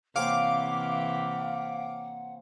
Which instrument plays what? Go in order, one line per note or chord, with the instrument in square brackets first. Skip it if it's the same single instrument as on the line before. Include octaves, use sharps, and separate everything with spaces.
[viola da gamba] C3 E3 [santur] A#3 C4 C#5 [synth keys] F5 D6 [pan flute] F#5